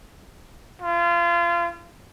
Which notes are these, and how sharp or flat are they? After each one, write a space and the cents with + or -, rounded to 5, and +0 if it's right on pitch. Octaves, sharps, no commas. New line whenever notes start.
F4 -30